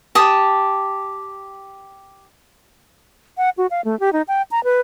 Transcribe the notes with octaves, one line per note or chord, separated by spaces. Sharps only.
G4 A5 D#6
F#5
F#4
F5
A3
G4
D#4
G5
A#5
B4